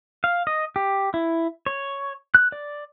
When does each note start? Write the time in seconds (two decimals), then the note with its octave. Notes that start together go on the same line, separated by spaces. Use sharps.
0.24 F5
0.47 D#5
0.76 G4
1.14 E4
1.66 C#5
2.35 F#6
2.52 D5